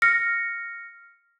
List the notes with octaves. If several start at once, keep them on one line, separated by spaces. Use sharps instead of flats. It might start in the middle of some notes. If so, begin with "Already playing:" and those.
F6 A#6 C#7